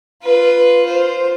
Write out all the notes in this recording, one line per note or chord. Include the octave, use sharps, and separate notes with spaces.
F4 B4
F4 C5